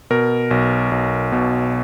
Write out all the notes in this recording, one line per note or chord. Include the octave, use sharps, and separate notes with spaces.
B2 A#4
B1
B1
B2